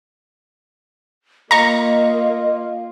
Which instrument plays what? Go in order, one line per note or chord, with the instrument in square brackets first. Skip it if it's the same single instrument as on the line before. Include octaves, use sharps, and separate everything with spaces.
[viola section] A#3 [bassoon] F4 [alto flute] D#5 [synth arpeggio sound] A#5 C#6